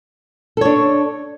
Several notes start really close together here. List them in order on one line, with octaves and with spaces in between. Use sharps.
A4 C#5 D4